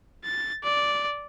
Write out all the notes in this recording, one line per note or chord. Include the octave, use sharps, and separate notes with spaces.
A6
D5